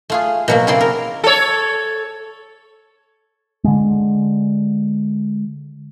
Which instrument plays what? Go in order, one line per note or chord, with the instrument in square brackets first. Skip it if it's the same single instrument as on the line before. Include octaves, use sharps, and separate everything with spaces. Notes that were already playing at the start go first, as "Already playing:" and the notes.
[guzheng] A3 F4 G#4
B2 F#3 A#3
C#3 F#3 C4 E4 D5 C6
A#4
[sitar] A4 C#5
[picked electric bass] D3 G#3